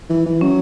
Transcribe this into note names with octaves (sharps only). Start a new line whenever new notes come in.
E3
E3
F#3 C#4